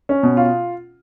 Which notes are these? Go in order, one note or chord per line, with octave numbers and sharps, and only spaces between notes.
C#4
B2
F4